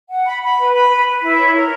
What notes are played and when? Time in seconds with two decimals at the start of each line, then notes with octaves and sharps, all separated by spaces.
0.09 F#5
0.25 B5
0.42 B5
0.58 B4
0.73 B5
0.90 B4
1.06 B4
1.22 E4
1.37 C#5
1.54 A#4